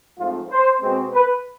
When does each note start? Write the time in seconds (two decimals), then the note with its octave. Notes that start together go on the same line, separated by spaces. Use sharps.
0.19 G#2 F3 A3 C4 F4
0.51 C5
0.82 B2 G#3 C4
1.14 B4